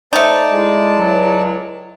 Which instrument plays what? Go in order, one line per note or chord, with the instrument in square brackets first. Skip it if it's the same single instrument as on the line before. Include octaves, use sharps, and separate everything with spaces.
[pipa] A3 D#4 [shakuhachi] C5 [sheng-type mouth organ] D5 A5
[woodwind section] G#3 [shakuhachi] E4
[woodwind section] C#2 F#3